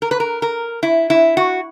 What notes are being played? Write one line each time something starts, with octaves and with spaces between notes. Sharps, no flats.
A#4
B4
A#4
A#4
E4
E4
F#4